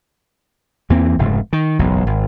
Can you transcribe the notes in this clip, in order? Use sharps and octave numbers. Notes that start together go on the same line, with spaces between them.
E2 E3 A#3 C4
F1 G#2 C#3
D#3
F#1 B1 E2
G#1